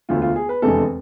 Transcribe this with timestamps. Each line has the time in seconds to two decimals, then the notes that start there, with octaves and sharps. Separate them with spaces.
0.09 E1 D2 D3 A3 F4
0.22 F4
0.36 G#4
0.49 B4
0.62 F1 E2 D3 G#3 A4